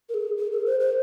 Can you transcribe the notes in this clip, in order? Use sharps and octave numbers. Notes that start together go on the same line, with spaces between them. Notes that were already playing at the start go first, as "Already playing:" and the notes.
A#4
G#4
G#4
A#4
C5
C5